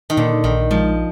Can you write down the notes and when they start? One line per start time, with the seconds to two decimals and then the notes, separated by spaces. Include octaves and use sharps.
0.10 D#3
0.17 A#2 D3
0.44 A#1 D#3
0.71 F3 G#3